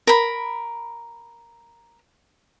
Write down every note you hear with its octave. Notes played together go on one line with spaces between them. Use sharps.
A#4 B5